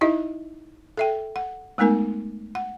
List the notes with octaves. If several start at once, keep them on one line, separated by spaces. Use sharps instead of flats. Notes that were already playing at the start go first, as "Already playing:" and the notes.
D#4 E4 G4 D#5 E5
A4 E5 G5
F#5
G#3 A3 B3 D#4 A#4 G#5
F#5